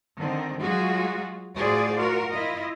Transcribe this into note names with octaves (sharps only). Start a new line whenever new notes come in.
D3 D#3 C4
F#3 G#3 F4 F#4 G#4
A2 F4 F#4 G#4 C5 D5
F4 F#4 A#4
E4 F4 D#5